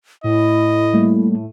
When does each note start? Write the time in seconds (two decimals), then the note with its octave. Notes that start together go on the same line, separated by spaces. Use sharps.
0.24 A2 E4 D#5
0.94 G3 A3 A#3